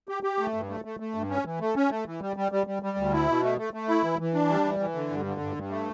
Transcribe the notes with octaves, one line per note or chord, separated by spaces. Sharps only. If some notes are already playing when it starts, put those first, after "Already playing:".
G4
G4
A3
G2
A3
A3
A3
G2
C#4
E3
A3
C#4
A3
E3
G3
G3
G3
G3
G3
D2
E4
B2
A3
A3
A3
E4
E3
E3
D4
G3
E3
E3
D3
G2
D3
G2
G2
A3